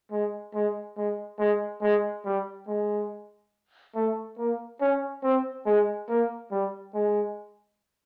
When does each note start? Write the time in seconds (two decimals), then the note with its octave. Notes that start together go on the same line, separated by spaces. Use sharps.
0.12 G#3
0.55 G#3
0.97 G#3
1.39 G#3
1.82 G#3
2.25 G3
2.68 G#3
3.95 A3
4.38 A#3
4.81 C#4
5.23 C4
5.66 G#3
6.09 A#3
6.51 G3
6.94 G#3